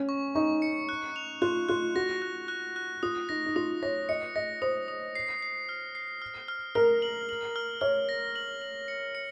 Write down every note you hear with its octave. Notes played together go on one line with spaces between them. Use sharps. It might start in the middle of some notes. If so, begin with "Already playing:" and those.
Already playing: C#4
C#6
D#4 C#6
C#7
F#6
F7
F4 F#6
F4 F#6
F#4 A#6
F#6
F#6
F#6
F4 D#6
D#4 A#6
D#4
F4 D#6
C#5 A#6
D#5 C#7
D#5 A#6
C5 D#6
D#6
C7
C7
F6
C7
F6
F6
A#4 F6
F#7
F#7
F6
C#5 F6
A#6
F#7
F#7
C#7
C#7